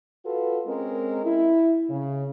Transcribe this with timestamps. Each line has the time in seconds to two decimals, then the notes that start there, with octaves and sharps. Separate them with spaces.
0.25 F4 F#4 A4 B4
0.66 G#3 C4 C#4 A#4
1.23 E4
1.89 C#3